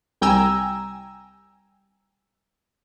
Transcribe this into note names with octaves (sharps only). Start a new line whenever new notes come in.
C2 G3 G5 G#5 A#5 E6